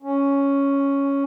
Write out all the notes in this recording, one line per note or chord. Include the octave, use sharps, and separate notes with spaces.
C#4